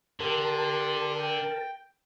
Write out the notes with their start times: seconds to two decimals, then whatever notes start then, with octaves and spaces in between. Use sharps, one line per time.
0.20 D3 G4 A#4 A5 C6
1.19 G5